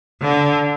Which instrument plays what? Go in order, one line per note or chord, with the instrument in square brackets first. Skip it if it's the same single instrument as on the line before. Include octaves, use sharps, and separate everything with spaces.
[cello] D3